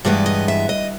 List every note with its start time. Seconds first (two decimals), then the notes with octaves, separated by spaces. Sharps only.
0.05 G2 E3 G#3 B3 D5
0.26 D#5
0.48 E5
0.69 D#5